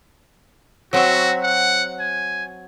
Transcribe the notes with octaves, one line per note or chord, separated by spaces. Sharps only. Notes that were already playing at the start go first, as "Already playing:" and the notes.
F#3 C4 F#4 E5
F#5
G#5